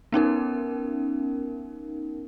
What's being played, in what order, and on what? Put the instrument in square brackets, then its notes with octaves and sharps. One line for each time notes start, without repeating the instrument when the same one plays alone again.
[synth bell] B3 C#4 D#4 A#4